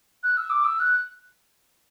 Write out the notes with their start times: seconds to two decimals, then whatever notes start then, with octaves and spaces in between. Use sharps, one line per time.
0.23 F#6
0.37 E6
0.50 D6
0.65 E6
0.80 F#6